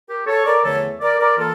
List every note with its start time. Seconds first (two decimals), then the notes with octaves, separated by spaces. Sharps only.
0.09 G4 A#4
0.27 A4 C#5
0.46 A#4 D5
0.64 E2 D3 F3 A3 A4 C#5
1.01 A#4 D5
1.19 A#4 D5
1.38 E3 A#3 F4 A4